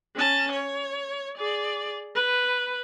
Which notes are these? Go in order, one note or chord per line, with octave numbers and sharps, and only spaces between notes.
C#4 A5
C#5
G#4 D5
B4